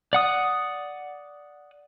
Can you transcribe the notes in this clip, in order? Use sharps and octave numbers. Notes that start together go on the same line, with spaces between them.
D5 F#5 D#6